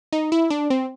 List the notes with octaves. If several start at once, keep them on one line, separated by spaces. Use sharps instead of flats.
D#4
E4
D4
C4